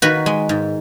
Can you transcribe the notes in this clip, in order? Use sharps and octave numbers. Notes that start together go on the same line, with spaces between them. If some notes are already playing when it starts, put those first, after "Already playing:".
D#3 F#4 B4
G#3
G#2